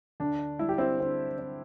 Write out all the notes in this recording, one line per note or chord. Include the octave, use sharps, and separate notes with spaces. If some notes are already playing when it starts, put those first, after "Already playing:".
D2 D4
G3 E4
G4
C4 E4
D3 C4
C4